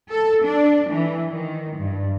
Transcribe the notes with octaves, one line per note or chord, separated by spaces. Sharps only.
A4
D4
E3
D#3
G2